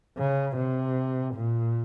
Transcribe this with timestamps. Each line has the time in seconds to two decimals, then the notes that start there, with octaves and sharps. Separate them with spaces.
0.18 C#3
0.57 C3
1.35 A#2